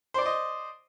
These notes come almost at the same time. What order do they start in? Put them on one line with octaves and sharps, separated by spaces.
C5 D5 C6 D#5